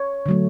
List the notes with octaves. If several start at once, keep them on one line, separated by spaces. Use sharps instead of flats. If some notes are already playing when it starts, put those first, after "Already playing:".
Already playing: C#5
D3 F#3 A3